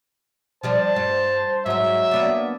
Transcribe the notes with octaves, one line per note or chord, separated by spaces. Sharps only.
F3 G3 D4 C5 A5
G2
G#2 F#3 D#5 E5
A#3 B3 D4